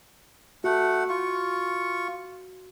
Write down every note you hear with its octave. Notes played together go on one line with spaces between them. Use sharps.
A3 F#4 F#5
F4 C#6